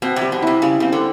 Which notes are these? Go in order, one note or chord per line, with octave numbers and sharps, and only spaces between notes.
B2 C4
C3
G3
B2
C3 E4
C#3 G3
C#3 C4
D3